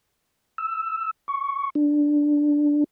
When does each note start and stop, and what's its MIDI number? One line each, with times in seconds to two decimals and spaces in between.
0.58 1.11 88
1.28 1.70 85
1.75 2.84 62